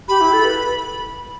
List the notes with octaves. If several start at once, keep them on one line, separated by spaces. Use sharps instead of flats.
G4 B5
E4
A4
B4